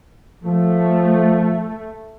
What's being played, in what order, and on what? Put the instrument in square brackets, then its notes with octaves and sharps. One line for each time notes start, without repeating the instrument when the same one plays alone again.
[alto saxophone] F3 [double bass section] A3